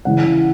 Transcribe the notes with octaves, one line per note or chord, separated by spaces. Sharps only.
C#3 E3 F#5